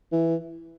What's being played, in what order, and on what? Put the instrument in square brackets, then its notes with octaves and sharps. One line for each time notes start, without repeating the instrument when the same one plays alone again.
[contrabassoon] E3